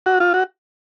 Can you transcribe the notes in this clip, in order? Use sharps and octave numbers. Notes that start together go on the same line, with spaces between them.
F#4
F4
F#4